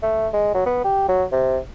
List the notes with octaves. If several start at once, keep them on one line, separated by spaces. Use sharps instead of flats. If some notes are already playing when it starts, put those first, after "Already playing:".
A3
G#3
F#3
B3
G4
F#3
C3